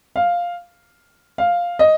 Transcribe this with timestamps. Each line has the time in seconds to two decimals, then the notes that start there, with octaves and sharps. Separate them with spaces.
0.16 F5
1.38 F5
1.79 D#5